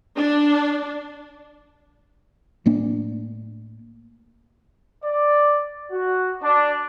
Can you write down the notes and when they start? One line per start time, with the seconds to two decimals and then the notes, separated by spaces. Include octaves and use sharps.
0.17 D4
2.66 A2 A#3 D4
5.04 D5
5.92 F#4
6.43 D4